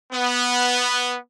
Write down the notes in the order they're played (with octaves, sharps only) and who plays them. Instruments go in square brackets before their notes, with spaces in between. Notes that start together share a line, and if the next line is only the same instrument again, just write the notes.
[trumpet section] B3